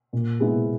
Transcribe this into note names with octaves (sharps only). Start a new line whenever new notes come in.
A#2
G#3 B3 E4